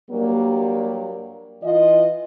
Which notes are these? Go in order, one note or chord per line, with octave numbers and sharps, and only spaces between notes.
G2 F#3 G3 A#3
E3 F4 D#5